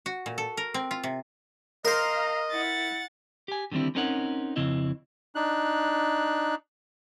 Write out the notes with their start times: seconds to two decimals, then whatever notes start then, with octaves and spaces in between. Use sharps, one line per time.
0.06 F#4
0.26 A#2
0.38 A4
0.57 A#4
0.74 C4
0.91 F4
1.03 C3
1.85 A#4 C5 D#5 F5 A#5
2.52 E4 F#5 A6
3.48 G4 G#5
3.72 D3 D#3 G3 C4 E4
3.95 C4 C#4 D#4 A#4 C#5 F#5
4.56 F2 C#3 C4 E4 D#5
5.35 D4 D#4 F#6